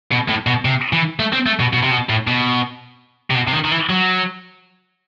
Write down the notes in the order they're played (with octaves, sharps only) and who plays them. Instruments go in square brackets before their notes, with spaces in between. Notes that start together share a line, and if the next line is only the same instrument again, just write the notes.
[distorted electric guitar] B2
A2
B2
C3
E3
A3
C4
A3
B2
B2
C3
B2
A2
B2
C3
B2
C3
D#3
D#3
E3
F#3